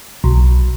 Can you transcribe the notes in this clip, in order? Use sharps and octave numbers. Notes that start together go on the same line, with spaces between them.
B1